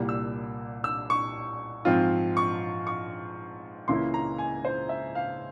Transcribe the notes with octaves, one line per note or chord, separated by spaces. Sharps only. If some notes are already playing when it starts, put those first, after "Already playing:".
Already playing: C2 A#2 G3 A#3
E6
E6
C#6
G#2 F3 C4 F4
C#6
C#6
C#2 C#3 E3 A#3 E4 C6
A#5
G#5
C5
E5
F5